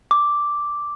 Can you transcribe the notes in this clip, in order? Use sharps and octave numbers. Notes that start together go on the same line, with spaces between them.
D6